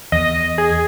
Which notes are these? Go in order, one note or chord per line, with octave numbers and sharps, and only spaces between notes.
E2 D#5
G#4